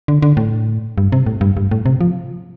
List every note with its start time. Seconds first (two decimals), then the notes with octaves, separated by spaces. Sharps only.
0.08 D3
0.22 D3
0.37 A2
0.98 G2
1.12 C3
1.27 A2
1.41 G2
1.57 G2
1.71 A2
1.86 C3
2.01 F3